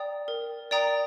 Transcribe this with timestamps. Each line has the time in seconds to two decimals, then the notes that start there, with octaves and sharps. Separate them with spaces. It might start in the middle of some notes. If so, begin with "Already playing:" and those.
Already playing: D5 G5 A#5 D#6
0.28 A#4
0.71 D5 G5 A#5 D#6